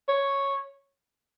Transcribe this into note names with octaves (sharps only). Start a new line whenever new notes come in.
C#5